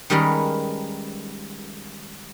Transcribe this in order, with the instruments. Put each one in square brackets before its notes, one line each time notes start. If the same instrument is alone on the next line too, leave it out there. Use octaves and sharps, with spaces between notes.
[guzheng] D#3 G3 G#3 C#4 A#4 B4